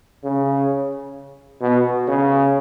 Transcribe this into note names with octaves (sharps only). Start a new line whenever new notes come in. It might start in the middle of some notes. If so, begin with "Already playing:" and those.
C#3
B2
C#3